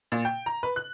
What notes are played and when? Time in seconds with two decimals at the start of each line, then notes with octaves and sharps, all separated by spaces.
0.12 A#2
0.25 G5
0.46 A#5
0.63 B4
0.76 F#6